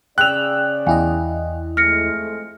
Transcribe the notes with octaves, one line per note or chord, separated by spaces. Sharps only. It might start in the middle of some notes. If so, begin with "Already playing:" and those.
C#3 D5 G5 E6 F#6 F7
E2 E4 D#5 F5 G5 G#5
F2 G#3 A3 F6 A#6 C#7